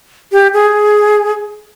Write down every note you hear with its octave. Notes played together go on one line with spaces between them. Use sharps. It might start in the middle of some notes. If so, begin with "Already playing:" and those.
G4
G#4